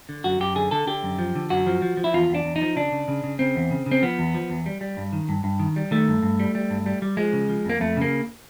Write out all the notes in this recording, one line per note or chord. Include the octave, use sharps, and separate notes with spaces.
D3
F#2 F#4
F#2 G4
D3 G#4
D3 A4
D3 G4
F#2
F3
D3
F#2 F#4
F3
F3
F3
E4
E2 F4
E2 D4
E2
D#4
F3
C#3 D4
C#3
C#3
C#3
C#3 C4
E2
C#3
C#3
C4
F3 B3
E2
F3
E2
G3
G3
G2
D#3
G2
G2
D#3
G3
D#3 A3
G2
G2
G3
G3
G2
G3
G3
F3 G#3
C#3
F3
F2 A#3
F2 A3
C#3 A#3